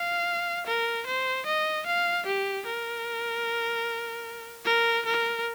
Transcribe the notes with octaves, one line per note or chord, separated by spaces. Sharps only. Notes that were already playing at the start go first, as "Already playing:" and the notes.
Already playing: F5
A#4
C5
D#5
F5
G4
A#4
A#4
A#4